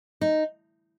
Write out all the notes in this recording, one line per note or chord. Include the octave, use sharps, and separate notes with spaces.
D#4